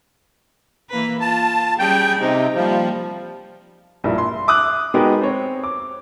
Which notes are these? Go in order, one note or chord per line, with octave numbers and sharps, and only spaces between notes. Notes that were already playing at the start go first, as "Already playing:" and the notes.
E3 A#3 B4
F4 A5
G3 C#4 G#4 G5
C3 D#4
F3 G3 A#3
A#1 G2 E4 A#4
C6
E5 D6 D#6 F#6
G#3 B3 D#4 F#4 G4 A#4
C4 C#5
D6